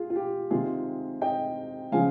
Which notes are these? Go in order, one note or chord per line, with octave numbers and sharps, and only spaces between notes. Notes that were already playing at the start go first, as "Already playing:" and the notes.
Already playing: F4 G#4
F4
G4
C3 D#3 G#3 F4 G#4
D#5 G5
C#3 F3 G#3 F5 G#5